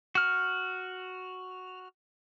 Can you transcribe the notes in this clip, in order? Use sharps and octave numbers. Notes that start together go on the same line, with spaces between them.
F#4 F6